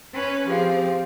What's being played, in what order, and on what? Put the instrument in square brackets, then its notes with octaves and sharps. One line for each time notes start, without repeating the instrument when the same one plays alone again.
[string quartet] C#4 B4
[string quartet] F3 C4 [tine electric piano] G4 G#4 F5